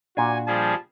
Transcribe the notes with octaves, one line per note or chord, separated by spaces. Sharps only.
A#2 D4 F#4 G#5
F3 G3 G#4 A5